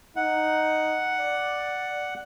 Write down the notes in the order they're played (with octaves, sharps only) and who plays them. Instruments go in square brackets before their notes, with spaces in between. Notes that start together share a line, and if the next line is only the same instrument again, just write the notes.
[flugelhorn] D#4 [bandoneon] F#5
[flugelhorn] D5